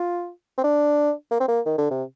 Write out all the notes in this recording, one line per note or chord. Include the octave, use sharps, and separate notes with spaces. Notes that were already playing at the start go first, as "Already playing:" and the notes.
Already playing: F4
C4
D4
A#3
C4
A#3
D#3
D3
C3